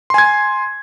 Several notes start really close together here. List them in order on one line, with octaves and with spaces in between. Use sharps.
C6 G#5 G#6